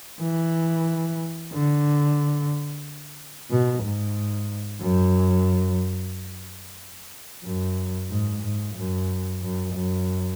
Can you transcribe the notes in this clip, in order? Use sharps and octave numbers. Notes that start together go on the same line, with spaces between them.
E3
D3
B2
G#2
F#2
F#2
G#2
G#2
F#2
F#2
F#2